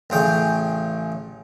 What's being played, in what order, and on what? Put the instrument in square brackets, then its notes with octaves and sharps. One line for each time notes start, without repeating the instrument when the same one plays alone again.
[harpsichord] A1 C#3 G5